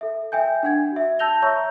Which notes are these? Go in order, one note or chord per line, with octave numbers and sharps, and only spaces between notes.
A4 E5
E5 G5 G#5 G6
D4 F#5 G#6
F#4 E5
A5 E6 G6 A#6 F7 G7
C#5 E5 A#5 C#6 E6 G6